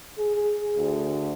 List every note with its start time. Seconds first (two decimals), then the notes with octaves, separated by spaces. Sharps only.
0.18 G#4
0.77 D2